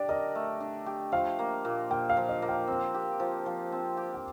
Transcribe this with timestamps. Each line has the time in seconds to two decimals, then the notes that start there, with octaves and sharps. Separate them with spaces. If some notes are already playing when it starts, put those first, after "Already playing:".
Already playing: D4 G4 D5
0.09 A#4 D#5
0.35 A3
0.61 D4
0.86 G4
1.12 F3 F5
1.39 A#3
1.65 A#2
1.91 A#2 G5
2.10 F5
2.17 F3
2.29 D#5
2.42 A#3
2.49 G5
2.67 C4
2.94 G4
3.20 F3
3.46 F3
3.72 C4
3.97 G4
4.14 G5